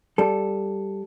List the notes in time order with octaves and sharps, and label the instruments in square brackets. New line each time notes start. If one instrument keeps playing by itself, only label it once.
[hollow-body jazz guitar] G3 A4